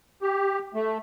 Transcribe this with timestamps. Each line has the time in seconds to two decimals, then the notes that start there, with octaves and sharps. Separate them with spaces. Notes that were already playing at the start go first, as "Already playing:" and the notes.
0.22 G4
0.74 A3